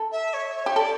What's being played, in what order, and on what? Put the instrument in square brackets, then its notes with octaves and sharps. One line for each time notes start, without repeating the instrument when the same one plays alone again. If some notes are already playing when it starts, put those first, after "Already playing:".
Already playing: [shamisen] A4
[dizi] E5
C#5
C#5
[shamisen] G4 [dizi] C#5
[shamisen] A4 [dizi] D5